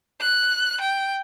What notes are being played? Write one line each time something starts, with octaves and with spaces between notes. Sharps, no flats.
F#6
G5